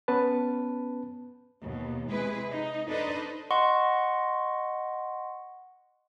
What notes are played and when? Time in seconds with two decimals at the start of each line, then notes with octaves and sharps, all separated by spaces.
0.08 B3 C#4 B4 A5
1.62 D#2 B2
2.10 C3 G#3 E4 G#4 B4
2.52 D#4
2.89 D4 D#4 A4 B4 C5 D#5
3.51 D#5 F#5 C6 C#6